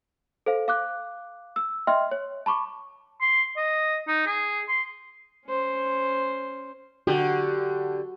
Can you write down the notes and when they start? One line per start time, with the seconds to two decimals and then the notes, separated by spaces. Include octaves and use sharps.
0.46 A4 C5 F5
0.68 F5 D6 F#6
1.56 E6
1.87 D#5 E5 G5 C6 F6
2.11 C#5
2.46 A5 B5 C#6 D6
3.21 C6
3.57 D#5
4.07 D#4
4.26 G#4
4.69 C6
5.45 C#4 C5
7.07 D3 F#4 G4